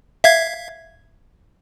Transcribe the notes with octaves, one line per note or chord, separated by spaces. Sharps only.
E5 F5 G#6